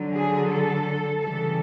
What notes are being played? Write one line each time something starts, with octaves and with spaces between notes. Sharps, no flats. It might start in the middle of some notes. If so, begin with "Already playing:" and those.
Already playing: D3 F#3
G#4
A4
C#3 E3 G3 A4